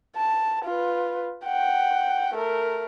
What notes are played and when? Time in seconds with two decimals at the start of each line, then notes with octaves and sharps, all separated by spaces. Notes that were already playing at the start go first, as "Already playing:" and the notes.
0.16 A5
0.65 F4 B4
1.45 F#5 G5
2.35 A3 A#4